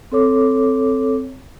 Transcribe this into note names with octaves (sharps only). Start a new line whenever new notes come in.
C4 A4 C#5 D6